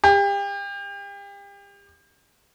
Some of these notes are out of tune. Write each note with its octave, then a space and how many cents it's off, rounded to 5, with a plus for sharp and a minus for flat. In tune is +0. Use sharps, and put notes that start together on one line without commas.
G4 +35